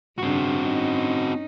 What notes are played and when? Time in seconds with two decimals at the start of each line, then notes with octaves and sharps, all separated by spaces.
0.18 G2 C#3 C4 D4 F#4
0.62 C#4 D#4